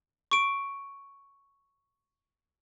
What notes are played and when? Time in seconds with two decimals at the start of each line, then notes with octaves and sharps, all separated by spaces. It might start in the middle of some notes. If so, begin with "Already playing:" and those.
0.31 C#6 D7